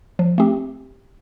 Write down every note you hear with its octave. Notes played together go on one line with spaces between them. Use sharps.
F3
A3 C4 G4